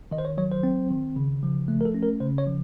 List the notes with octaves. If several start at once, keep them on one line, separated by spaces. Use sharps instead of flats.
D#3 D#5
C5
C#5
F#3 C#5
C5
C4
D#3
C#3
F3
A3
A#4
A4
C#4
A#4
C#3 C5
C#5
F3